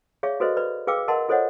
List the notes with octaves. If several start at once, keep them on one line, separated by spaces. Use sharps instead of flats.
G#4 C#5 D5 E5 F5 C#6
F#4 A4 B4 C5 D#5
B4 D5 B5
G#4 B4 F5 G5 D6 E6
A#4 D#5 F#5 A5 C6
F4 A4 C5 C#5 D#5 F#5